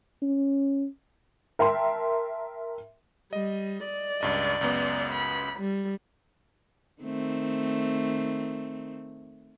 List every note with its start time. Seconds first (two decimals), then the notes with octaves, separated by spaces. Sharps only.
0.22 C#4
1.59 A#4 E5 G5 A5 C6
3.33 G3 D#5
3.85 D5
4.21 C#2 G2 D#5
4.61 C#2 F#2 B3
5.12 B5
5.59 G3
7.02 D#3 A3 C4